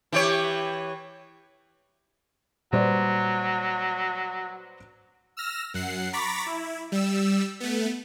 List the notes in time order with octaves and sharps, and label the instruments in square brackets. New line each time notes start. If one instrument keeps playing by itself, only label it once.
[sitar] E3 G4 C#5
[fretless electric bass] A#2 G3 [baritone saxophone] F#3 [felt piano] B4 C5 D5
[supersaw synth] E6 F6 A#6
F#2 F#5 C7
A#5 B5 C#6 D6 A6 B6
E4
G3 E6
A3 B3